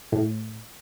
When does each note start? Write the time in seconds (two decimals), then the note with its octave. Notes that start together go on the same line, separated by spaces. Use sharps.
0.12 A2